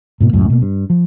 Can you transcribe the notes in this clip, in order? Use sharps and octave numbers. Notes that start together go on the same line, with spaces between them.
G#2 B2 A#3
C#2 F#2 A2
B2 A#3
G2
F3